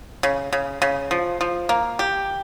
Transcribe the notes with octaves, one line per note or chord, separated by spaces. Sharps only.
C#3
C#3
C#3
F3
F3
A#3
G4